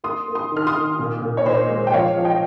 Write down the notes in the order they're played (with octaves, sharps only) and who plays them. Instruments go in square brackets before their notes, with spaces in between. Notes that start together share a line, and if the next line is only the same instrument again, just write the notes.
[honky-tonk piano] A#3 C6 D#6
A#3
C6 D#6
D#3 F6
C6 D#6
D#3
A#2
A#2
C#5
A#2 C5 D#5
G#3
G5
F3 C#5 F5
F3
D#5 G5